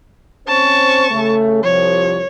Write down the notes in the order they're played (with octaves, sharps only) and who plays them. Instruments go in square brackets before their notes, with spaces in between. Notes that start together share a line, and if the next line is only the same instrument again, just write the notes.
[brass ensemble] C4 C#4 C5 [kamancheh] A5 C#6
[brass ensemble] C#3 A3
[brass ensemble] C2 C3 F3 [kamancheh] C#5